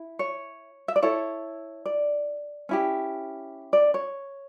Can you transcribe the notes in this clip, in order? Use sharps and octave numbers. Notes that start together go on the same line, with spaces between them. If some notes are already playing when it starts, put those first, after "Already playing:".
Already playing: E4
C#5
E5
D5
E4 A4 C#5
D5
C#4 E4 G4
D5
C#5